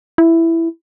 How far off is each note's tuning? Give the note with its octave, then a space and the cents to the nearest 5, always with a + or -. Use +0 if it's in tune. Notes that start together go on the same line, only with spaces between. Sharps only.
E4 +5